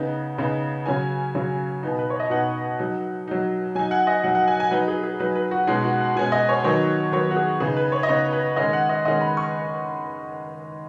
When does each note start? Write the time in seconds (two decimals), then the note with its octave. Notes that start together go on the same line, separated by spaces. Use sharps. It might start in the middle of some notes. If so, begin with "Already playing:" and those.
Already playing: C#3 B3 D#4
0.38 C#3 B3 D#4
0.86 C#3 F#3 C#4 G#5
1.35 C#3 F#3 C#4
1.83 B2 B3 D#4
1.99 B4
2.10 C#5
2.20 D#5
2.30 B2 B3 D#4 F#5
2.79 F#3 D#4
3.28 F#3 D#4
3.75 F#3 D#4 G#5
3.91 F#5
4.07 D#5
4.23 F#3 D#4 F#5
4.35 F#5
4.48 G#5
4.60 G#5
4.71 F#3 D#4 B4
4.88 G#4
5.04 G#4
5.20 F#3 D#4 B4
5.35 B4
5.51 F#4
5.67 B2 G#3 C#4 D#4
5.84 F#4
6.00 F#5
6.15 B2 G#3 C#4 G#5
6.32 D#5
6.49 C#5
6.64 D#3 F#3 B3 D#4 C#5
7.12 D#3 F#3 B3 D#4 C#5
7.31 F#4
7.36 G#4
7.60 C#3 B3 D#4 G#4
7.76 B4
7.92 C#5
8.03 D#5
8.09 C#3 B3 D#4 C#5
8.33 B4
8.56 D#3 G#3 C#4 D#5
8.73 F#5
8.89 D#5
9.05 D#3 G#3 C#4 D#5
9.21 B5
9.37 C#6